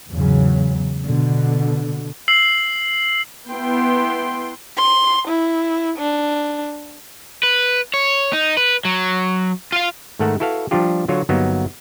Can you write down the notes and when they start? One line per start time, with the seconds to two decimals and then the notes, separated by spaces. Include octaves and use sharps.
0.12 E2 G#2 C#3 F#3
1.06 B2 D3
2.28 E6 C7 F#7
3.50 B3 E4 G5 C6
4.77 C6
5.28 E4
5.98 D4
7.43 B4
7.94 C#5
8.33 D#4
8.57 B4
8.85 F#3
9.72 F4 F5
10.19 G#2 D#3 A3 A4 A#4 F#5
10.40 E4 F#4 A4 B4 F5
10.71 F3 G3 D4 F4 G4
11.08 D3 F#3 F4 F#4 C#5
11.29 G1 F#3 A#3 B3 D#4